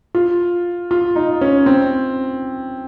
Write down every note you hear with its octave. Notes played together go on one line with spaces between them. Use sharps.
F4
F4
D#4
C#4
C4